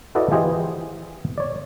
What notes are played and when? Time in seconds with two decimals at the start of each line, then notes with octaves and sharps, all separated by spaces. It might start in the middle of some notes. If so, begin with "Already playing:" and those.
0.15 E4 F#4 A4 B4 D5 D#5
0.31 E3 F4 G4 G#4 C5 D#5
1.38 C#5 D5